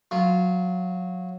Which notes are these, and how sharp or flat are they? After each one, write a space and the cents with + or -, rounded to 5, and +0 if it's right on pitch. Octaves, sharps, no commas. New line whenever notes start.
F#3 -15 F4 -15